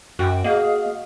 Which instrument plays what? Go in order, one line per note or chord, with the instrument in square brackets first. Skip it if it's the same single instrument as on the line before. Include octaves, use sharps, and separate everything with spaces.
[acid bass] F#2 [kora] F#4 [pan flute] G5
[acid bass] A#3 [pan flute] G#4 [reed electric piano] D#5 F5